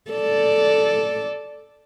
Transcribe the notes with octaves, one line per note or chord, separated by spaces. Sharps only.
A4 D5